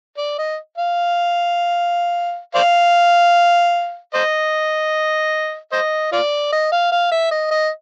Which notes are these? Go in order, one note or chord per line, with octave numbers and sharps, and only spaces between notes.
D5
D#5
F5
C5 D5 F5
C5 D#5
C5 D#5
F4 D5
D#5
F5
F5
E5
D#5
D#5